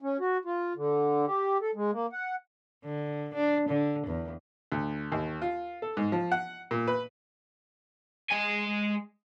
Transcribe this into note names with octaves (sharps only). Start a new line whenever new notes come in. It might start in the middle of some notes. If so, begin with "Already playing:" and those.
C#4
F#4
F4
D3
G4
A4
G#3
A#3
F#5
D3
D4
D3
E2
D2
D#2
F4
A4
G#2
F3
F#5
A#2
B4
G#3 G#5